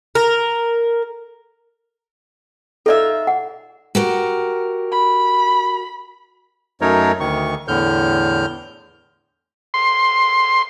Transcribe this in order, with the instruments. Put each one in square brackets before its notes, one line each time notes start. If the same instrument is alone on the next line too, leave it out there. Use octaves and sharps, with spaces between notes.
[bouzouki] A#4
[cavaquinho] D#4 F4 E5 [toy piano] A4 D5
[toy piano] F#5
[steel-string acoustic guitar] F#4 G4 A#4
[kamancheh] B5
[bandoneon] F#2 F#3 A3 D#4 A#4 C#5
D2 D#3 C#6
E2 A2 D3 F6 G6
[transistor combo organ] C6